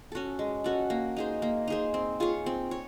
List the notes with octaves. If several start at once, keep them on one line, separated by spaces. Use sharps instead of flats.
C#4 F#4 A4
G#3
C#4 F#4 A4
A#3
D#4 G#4 C5
A#3
D#4 G#4 C5
C4
F4 G#4 C#5
C4
C#5